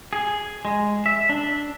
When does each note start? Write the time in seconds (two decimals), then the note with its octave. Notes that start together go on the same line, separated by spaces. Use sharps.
0.13 G#4
0.65 G#3
1.06 E5
1.29 D4